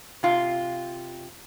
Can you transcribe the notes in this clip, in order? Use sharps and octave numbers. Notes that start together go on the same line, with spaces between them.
C3 F4